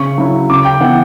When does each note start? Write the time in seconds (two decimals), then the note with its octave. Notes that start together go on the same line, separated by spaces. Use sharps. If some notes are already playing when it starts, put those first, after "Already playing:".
Already playing: C#3 C#6
0.18 F#3 C#4 E4
0.50 C#3 D6
0.65 G5
0.81 E3 B3 E4 F#5